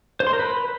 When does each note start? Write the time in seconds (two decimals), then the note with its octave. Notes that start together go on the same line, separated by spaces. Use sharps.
0.20 C5
0.27 C6
0.33 A#4
0.39 B4